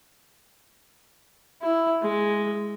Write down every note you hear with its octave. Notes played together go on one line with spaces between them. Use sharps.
E4
G#3